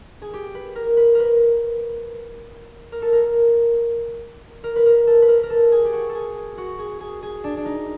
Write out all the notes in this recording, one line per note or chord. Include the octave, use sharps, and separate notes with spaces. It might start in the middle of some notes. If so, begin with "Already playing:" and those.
G#4
G4
B4
A#4
B4
A#4 B4
A#4
A4
A#4
A#4
B4
A#4
A4
B4
A#4
A#4
A4
G#4
G4
F#4
A4
G#4
F#4
G#4
G#4
G#4
D4
D4
D#4